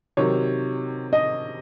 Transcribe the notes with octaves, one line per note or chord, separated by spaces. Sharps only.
C3 D#3 F#3 C#5
D#5